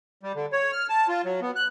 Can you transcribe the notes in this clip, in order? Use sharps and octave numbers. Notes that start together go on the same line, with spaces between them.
G3
D3
C#5
F6
A5
F4
F#3
B3
F#6